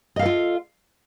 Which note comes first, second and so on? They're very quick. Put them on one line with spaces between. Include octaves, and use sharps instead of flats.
D#5 F5 A4 F4